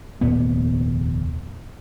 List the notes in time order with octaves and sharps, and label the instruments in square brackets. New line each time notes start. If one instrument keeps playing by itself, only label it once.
[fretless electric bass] F1 D#2 A#2 B3